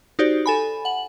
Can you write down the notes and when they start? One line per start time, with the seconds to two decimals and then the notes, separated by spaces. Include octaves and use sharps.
0.19 D#4 F#4 G4 C5 D5
0.46 A4 G#5 B5
0.85 F#5 F#7